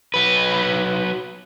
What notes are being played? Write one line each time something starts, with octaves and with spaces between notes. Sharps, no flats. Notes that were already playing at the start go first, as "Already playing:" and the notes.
F#3 B4